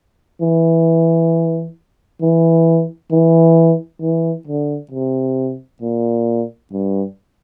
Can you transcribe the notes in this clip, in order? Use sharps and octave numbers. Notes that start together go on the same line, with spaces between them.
E3
E3
E3
E3
D3
C3
A#2
G2